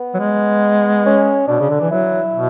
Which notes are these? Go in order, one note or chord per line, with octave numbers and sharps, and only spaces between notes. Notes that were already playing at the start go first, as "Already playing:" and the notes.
Already playing: B3
F#3
G#3
C#4
B2 D4
C#3
D3
E3
F#3 E4
B2